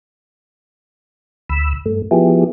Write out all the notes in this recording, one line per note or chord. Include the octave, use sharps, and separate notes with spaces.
D2 B5 E6
G2 A3
F3 B3 E4 G4 G#4